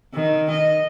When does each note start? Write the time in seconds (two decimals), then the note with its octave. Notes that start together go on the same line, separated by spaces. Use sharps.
0.14 D#3
0.51 D#5